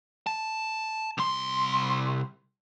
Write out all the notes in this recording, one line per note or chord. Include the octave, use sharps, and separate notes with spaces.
A5
C2 C6